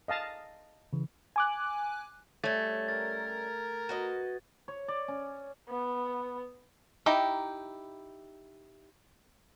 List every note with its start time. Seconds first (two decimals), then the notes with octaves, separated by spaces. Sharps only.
0.08 D#5 F5 A5
0.93 C#3 E3
1.36 G#5 D6 F#6
2.44 G3 A3 C#4 G#6 A6
2.89 A#4 A6
3.89 F#4 B4 D#5
4.68 C#5
4.88 D5
5.08 C#4
5.69 B3
7.06 D#4 E4 G4 G5 A#5